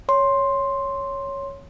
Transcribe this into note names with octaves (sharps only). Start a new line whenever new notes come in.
C#5 C6